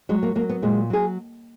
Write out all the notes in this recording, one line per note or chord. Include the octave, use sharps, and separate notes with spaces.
F#3 G#3
A#3
F#3 A#3
B3
A#2 G#3
F#3 G#4